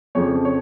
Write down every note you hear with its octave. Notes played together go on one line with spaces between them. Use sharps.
F2 C#3 F3 C#5
C#5